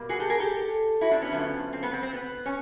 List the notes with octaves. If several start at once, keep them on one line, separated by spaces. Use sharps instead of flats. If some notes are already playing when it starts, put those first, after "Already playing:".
Already playing: B2 G3 A#3
F#4 G#4
G4 A4
G#4 A#4
G4 A4
E4 F#4
C4 D4
B3 C#4
F#2 D3 F3 A3
C4
B3
C4
C4
B3
C#4